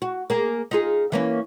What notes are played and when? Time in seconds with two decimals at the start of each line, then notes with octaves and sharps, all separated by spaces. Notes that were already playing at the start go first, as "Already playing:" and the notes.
0.02 F#4
0.30 A#3 G#4
0.71 D#4 F4 G#4
1.12 E3 A#3 C#4